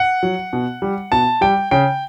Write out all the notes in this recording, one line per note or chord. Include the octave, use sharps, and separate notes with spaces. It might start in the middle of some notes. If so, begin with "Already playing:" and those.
Already playing: F#5
F#3
B2
G3
B2 A5
G3 G5
C#3 G5